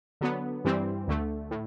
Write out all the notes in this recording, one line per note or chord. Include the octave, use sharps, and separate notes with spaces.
D3 F#3 B3
G2 E3 G3 C4
D2 D3 A3
A2